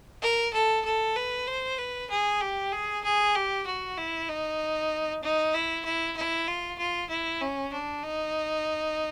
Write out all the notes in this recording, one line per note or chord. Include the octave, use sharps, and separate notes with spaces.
A#4
A4
A4
B4
C5
B4
G#4
G4
G#4
G#4
G4
F#4
E4
D#4
D#4
E4
E4
E4
F4
F4
E4
C#4
D4
D#4